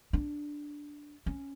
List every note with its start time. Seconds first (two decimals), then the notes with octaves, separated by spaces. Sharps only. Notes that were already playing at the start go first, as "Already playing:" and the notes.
0.13 D4
1.26 C#4